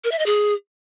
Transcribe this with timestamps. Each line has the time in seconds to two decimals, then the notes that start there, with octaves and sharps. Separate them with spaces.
0.04 A#4
0.12 E5
0.19 D#5
0.26 G#4